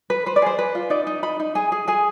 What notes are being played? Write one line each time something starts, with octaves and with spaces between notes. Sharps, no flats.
B4
B4 C5
D5
G#4 C5
B4
F4
D#4 D5
D#4
D#4 B5
D#4
G#4 G#5
G#4
G#4 G#5